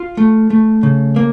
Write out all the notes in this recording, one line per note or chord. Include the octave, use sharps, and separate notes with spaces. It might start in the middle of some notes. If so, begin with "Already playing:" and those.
Already playing: F4 F5
A3
A3
C#3
A#3